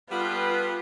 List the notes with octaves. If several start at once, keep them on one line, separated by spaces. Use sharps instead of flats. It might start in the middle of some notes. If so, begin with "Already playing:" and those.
G3 B3 F4 G4 A4 B4